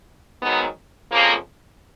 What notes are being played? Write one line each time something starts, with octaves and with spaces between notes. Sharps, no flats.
G#2 D#3 F#3 B3
F2 C#3 F3 A#3